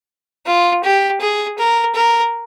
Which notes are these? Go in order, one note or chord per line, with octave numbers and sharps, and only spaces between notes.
F4
G4
G#4
A#4
A#4